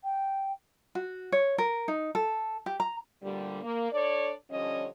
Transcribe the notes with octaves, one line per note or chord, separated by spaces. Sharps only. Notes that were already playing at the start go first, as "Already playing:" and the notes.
G5
F#4
C#5
A#4
D#4
A4
G4
A#5
D2 A#2 D3 G3
A#3
D4 A4 C#5 D5
D3 F3 G3 C#4 C#5 D#5